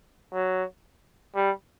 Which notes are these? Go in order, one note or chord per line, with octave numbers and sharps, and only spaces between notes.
F#3
G3